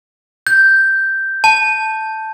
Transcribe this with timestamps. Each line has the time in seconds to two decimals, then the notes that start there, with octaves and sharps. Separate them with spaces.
0.47 G6
1.44 A5